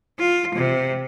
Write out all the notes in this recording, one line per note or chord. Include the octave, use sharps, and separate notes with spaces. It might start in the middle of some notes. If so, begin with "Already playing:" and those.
F4
C3